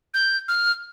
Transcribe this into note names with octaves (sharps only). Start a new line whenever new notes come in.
G6
F6